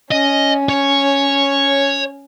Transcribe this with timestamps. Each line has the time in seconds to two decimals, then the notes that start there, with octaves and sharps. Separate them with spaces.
0.11 C#4 D#5
0.69 C#5